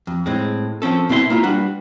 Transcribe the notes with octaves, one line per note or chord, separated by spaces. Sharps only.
F2
A2 G#3 C4
F3 C4 C#4 A4
B2 C4 E4 D5 C6
A#3 E4 F4
G3 D4 F#4 B4